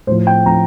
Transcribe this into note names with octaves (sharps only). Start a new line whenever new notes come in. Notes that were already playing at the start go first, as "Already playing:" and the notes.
A2 F3 C5
G5
A2 F3 A#5